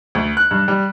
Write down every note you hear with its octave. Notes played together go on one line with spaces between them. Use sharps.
D2
F#6
G2
G3